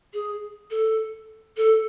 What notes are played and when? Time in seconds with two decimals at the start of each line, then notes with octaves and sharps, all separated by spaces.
0.14 G#4
0.71 A4
1.57 A4